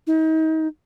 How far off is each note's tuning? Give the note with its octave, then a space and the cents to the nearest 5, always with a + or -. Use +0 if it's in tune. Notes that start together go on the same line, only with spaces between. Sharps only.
D#4 +35